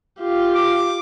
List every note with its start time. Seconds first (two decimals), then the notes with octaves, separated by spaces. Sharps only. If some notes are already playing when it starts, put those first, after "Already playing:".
0.20 F4 G4
0.54 D6